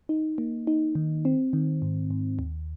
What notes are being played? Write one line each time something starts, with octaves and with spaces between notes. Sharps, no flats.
D#4
A#3
D#4
D#3
C4
D#3
G#2
G#2
D#2